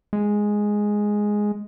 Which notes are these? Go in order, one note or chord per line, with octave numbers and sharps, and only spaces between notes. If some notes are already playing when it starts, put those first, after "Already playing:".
G#3